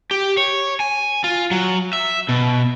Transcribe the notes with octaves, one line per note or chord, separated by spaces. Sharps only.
G4
C#5
G#5
F4
F#3
E5
B2